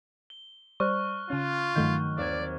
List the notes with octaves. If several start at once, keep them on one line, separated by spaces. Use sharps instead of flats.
G7
G3 C5 D5 C#6 F6 F#6
C#3 C#4 F4
G2 D#3 F#3 A3 G6
D#2 C4 D5 G#6